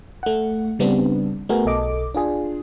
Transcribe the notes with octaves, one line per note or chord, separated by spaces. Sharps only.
A3 F#5
C#3 G3 B3 C4 D4
A3 B3 F#4 G#4 A#4
B1 A4 D#5 D6
D4 F4 G#4